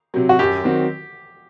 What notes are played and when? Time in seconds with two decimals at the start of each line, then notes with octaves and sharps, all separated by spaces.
0.14 C3 F#3
0.29 F#4
0.39 F#2 G4
0.64 D#3 F#3 C4 F#4